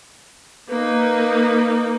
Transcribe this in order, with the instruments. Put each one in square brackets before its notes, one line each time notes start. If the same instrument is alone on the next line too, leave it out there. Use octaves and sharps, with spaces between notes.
[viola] A#3 D#4 [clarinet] B4